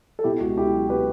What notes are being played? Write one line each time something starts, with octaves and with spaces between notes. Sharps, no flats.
A4
B2 E4 G4
C#2 F#4
C#2 E4 G4
F#3
B2 G4 B4